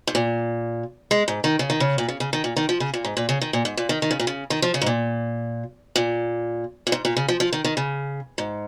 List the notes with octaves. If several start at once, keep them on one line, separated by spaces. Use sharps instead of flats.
G#2
A#2
G#3
G#2
D#3
C#3
D#3
C#3
A#2
C#3
C#3
D#3
A#2
D#3
F3
C#3
A#2
G#2
A#2
C#3
D#3
A#2
G#2
A#2
D#3
D#3
C#3
A#2
C#3
D#3
F3
C#3
G#2
A#2
A#2
A#2
G#2
A#2
C#3
F3
F3
D#3
D#3
C#3
G#2